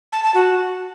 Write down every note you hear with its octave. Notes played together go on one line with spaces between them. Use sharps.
A5
A5
F#4